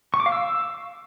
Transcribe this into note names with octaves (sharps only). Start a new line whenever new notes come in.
C#6
D6
F5
E6